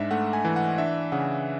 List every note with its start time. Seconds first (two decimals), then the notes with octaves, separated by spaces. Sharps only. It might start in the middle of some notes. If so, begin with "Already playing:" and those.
Already playing: G#2 D4 E5
0.11 A3 F#5
0.33 G#5
0.45 E3
0.56 F#5
0.78 D4 E5
1.12 C#3 F#5